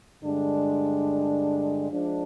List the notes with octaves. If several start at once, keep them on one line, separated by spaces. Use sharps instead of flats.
G2 D3 G#3 D4
F3 G#3 D4